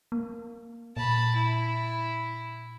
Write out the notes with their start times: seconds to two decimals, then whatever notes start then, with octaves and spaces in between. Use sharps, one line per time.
0.12 A#3
0.97 A#2 A5 B5
1.35 E4